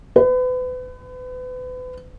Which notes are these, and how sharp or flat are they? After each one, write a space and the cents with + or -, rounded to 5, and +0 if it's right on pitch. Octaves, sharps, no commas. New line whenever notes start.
B4 +35